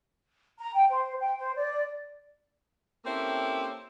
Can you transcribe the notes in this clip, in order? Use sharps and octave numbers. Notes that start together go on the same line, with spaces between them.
A#5
G5
C5
G5
C5
D5
A#3 C4 C#4 E4 G4 A4